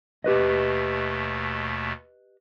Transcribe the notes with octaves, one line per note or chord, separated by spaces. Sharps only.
D#2 B2 A3 G4 B4 D#5